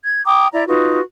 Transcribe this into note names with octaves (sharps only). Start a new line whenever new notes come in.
G#6
G5 A#5 D6 D#6
E4 D5 E5 A#5
D#4 F4 F#4 B4